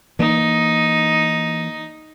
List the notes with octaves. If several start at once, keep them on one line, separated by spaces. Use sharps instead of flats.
E3 A#3 D#4